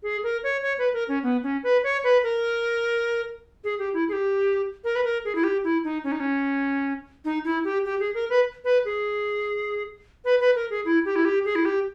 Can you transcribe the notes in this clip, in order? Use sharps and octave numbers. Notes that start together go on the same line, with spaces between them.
G#4
A#4
C#5
C#5
B4
A#4
C#4
B3
C#4
B4
C#5
B4
A#4
G#4
G4
E4
G#4
G4
A#4
B4
A#4
G#4
E4
G4
E4
D#4
C#4
D#4
C#4
D#4
E4
G4
G4
G#4
A#4
B4
B4
G#4
B4
B4
A#4
G#4
E4
G4
E4
G4
G#4
E4
G4